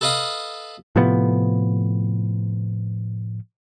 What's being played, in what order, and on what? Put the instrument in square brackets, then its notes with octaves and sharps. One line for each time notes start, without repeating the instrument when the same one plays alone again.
[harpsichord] A4 B4 D#5 F5 B5 D#6
[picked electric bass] A2 C3 F3 B3